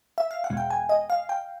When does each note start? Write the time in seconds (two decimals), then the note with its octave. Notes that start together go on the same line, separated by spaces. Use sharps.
0.18 E5
0.31 F5
0.44 F#5
0.50 E2 B2 G#3
0.57 G5
0.70 G#5
0.89 D#5
1.10 F5
1.29 G5